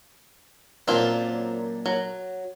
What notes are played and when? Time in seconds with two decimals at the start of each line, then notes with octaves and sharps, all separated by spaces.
0.88 F#2 A#2 C4 D4 F4
1.86 F#3